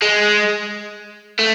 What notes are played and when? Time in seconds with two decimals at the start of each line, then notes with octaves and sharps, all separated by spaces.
0.02 G#3
1.39 A3